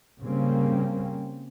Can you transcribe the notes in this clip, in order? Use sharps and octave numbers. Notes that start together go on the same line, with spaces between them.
C#3 G3 A#3 C4 C#4